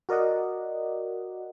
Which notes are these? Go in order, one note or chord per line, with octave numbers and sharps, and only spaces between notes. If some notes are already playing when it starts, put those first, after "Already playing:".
F#4 A#4 D5 D#5 F#5